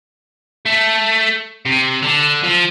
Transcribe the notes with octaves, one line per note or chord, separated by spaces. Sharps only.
A3
C3
D3
F3